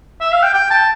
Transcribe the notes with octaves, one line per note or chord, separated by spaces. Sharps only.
E5
F5
G5
G5
A5